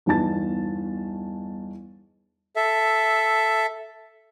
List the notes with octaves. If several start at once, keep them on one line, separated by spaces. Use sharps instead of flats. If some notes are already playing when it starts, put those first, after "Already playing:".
G1 E2 D#4 A5 A6
A4 E5